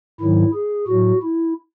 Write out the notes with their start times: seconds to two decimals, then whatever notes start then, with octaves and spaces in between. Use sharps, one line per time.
0.20 G#2 D#3 F#3 E4
0.54 G#4
0.88 A2 F#3 F#4
1.22 E4